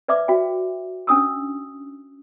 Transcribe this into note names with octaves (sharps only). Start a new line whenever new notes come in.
B4 D5 E5 D6
F#4 E5 G5
C#4 D4 D#6 E6